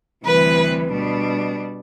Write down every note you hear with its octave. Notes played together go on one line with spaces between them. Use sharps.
D2 C3 E3 G3 B4
B2 G3 D4